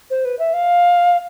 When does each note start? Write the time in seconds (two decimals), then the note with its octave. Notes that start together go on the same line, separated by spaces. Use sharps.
0.10 C5
0.25 B4
0.39 E5
0.54 F5